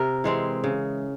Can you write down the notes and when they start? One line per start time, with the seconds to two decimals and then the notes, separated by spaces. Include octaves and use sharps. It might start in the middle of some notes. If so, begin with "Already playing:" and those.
Already playing: C3 A#4
0.24 E3 G#3 C4
0.64 C#3